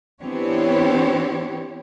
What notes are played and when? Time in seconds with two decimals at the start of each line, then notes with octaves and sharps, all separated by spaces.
0.22 E3 B3 C4 D4 G4 C#5